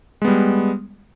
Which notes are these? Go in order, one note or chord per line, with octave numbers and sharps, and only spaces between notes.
G3 G#3 B3